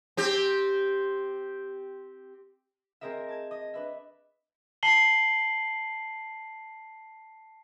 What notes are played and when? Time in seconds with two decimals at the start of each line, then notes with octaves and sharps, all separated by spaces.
0.17 C4 G4
3.01 C4 G#4 A#4 D#5 E5
3.28 A5 G#6
3.51 D#5 D#6
3.74 D4 B4 E5
4.83 A5 C7 F#7 G7